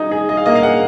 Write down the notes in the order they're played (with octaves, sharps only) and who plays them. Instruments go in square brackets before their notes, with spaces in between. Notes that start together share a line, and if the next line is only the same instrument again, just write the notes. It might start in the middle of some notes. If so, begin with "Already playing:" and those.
Already playing: [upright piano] D#4 G#4
G#4
[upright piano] G#4 [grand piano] D#5
[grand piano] F5
[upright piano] A#3 [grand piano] D#5
[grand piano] F5
[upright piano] G#4 [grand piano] F#5